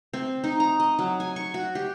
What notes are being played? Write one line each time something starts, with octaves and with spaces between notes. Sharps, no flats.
C4
D#4
A#5
D#5
F#3
G#5
C#6
F#4
G4